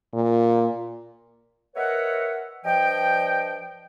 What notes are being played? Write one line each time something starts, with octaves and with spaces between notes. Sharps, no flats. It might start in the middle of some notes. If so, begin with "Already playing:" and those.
A#2
A#4 B4 C#5 D#5 E5 F#5
G2 F3 D5 D#5 G5